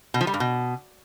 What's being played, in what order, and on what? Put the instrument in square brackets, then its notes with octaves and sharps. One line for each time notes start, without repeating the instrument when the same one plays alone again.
[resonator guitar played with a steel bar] B2
F3
G3
G2
B2